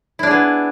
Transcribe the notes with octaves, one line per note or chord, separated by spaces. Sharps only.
B3 D4 E4 G#4